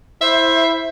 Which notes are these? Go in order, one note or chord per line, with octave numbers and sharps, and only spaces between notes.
E4 C5 E5